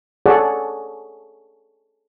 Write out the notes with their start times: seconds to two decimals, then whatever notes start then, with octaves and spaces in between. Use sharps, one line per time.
0.26 G#4 A4 C#5 D5 F#5